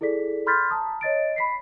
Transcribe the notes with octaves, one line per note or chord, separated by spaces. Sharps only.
E4 G#4 A4 D5 B6
B5 C6 F6 G6 A6 B6
A5 A#5 D#6
C#5 D#5 A6 D7
B5 B6 C7